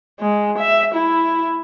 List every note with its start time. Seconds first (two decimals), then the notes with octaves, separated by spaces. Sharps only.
0.20 G#3
0.58 E5
0.95 E4